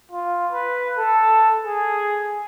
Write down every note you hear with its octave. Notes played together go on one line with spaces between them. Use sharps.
F4
B4
A4
G#4